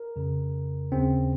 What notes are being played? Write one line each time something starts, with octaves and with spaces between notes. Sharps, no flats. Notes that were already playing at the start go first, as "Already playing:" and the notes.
Already playing: A#4
F2 C#3
D#2 C#3 C4